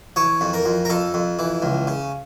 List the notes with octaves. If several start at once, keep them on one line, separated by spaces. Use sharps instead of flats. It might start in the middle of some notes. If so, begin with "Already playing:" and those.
E3 C#5
F2
A#4
F2
A#4
F2 A4
F2
E3
C#2
C#3